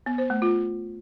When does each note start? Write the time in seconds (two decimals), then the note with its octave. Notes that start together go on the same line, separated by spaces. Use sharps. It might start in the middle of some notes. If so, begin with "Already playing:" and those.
0.06 B3
0.18 C5
0.30 A3
0.42 F4